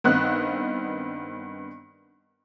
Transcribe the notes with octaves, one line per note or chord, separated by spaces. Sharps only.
G2 D#3 B3 C4 D#4 F#6